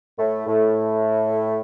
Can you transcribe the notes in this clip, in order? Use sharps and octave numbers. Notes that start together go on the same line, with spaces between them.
A2 A3
A2 A3